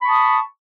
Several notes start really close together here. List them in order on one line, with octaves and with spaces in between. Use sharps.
B5 C#6 A5 D#6